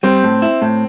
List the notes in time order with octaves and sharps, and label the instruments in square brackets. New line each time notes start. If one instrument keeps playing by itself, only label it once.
[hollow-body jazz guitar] G3 [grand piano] C4
[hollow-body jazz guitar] A2
E4
A2